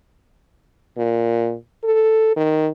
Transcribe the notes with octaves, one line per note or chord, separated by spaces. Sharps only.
A#2
A4
D#3